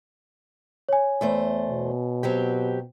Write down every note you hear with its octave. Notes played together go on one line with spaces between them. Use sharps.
C#5 G#5
E2 A3 C5
B2
F#3 C4 G4